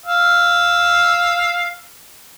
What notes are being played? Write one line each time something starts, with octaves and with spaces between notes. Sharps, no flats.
F5 E6